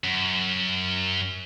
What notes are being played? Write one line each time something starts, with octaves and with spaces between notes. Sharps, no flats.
F#2